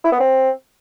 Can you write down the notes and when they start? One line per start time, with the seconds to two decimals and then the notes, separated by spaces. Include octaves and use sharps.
0.04 E4
0.12 B3
0.20 C4